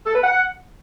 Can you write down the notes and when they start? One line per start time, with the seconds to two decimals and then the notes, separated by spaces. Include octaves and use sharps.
0.06 A4
0.15 B4
0.24 F#5